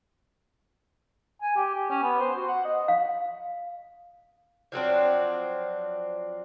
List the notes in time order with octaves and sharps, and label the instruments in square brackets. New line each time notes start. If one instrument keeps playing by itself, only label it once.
[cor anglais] G#5
G4
G4
C#4
B3
C5
F#4
F#5
D#5
[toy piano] F5
[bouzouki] F3 F#3 C4 D4